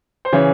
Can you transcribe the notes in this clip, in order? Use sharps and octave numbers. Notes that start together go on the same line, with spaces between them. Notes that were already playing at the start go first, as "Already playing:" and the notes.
C5
C#3 E3 C#5